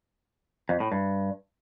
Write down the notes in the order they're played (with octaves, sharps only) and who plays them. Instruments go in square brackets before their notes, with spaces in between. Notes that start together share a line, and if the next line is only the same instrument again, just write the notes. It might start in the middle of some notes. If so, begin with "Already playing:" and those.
[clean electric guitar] F2
A2
G2